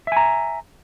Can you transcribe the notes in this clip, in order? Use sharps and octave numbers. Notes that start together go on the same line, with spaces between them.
E5 G#5 A#5